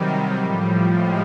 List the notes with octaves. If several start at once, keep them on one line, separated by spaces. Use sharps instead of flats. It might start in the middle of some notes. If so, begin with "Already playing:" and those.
Already playing: C3 D#3 F#3 G3
A2 F3
G#3